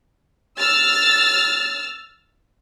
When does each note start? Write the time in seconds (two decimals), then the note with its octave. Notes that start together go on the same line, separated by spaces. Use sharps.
0.58 E6 F6 A6